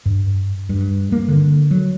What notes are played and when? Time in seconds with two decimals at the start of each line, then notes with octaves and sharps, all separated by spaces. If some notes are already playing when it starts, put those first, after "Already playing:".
0.06 G2
0.69 G2
1.12 A#3
1.28 D3
1.71 F#3